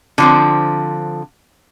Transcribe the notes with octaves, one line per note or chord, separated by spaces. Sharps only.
D3 F3 C4